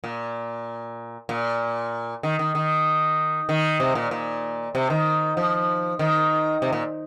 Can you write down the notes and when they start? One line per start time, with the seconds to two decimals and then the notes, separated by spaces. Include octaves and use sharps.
0.04 A#2
1.29 A#2
2.23 D#3
2.39 D#3
2.55 D#3
3.49 D#3
3.80 C3
3.95 A#2
4.11 A#2
4.75 C3
4.90 D#3
5.37 F3
5.99 D#3
6.62 C3
6.73 A#2